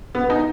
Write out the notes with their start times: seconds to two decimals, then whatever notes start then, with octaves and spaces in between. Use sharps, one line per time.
0.15 B3
0.30 D#4